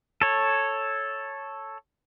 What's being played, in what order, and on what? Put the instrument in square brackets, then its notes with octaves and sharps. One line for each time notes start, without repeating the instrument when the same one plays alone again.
[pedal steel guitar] A4 C#5